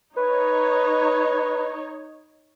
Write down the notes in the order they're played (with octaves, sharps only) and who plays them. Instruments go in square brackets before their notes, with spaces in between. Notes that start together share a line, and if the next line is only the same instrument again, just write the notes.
[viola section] D#4 C#5 [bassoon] B4